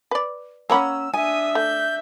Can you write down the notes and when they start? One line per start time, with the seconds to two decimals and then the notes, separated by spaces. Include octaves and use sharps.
0.11 B4 D5
0.70 A#3 C#4 C#5 F#5 A#5 B5 E6
1.13 D4 E5 G#5 D#6
1.55 A3 G6